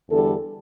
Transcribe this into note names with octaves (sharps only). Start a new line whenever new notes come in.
E2 D3 G3 A4